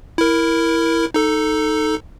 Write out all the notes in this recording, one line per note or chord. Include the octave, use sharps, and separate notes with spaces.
E4 A#4
D#4 A4